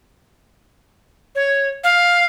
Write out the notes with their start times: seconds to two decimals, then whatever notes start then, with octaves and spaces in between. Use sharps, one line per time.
1.35 C#5
1.84 F5